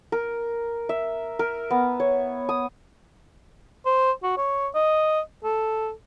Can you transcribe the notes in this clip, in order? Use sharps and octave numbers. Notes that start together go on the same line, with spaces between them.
A#4
E5
A#4
B3
C#5
D#6
C5
F#4
C#5
D#5
A4